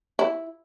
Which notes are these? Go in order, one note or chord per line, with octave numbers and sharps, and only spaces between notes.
E4